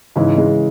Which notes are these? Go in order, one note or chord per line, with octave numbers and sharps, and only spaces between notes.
G#2 C#3 E3
G#3